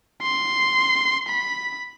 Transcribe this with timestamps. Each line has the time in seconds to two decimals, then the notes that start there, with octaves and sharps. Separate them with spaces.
0.22 C6
1.28 B5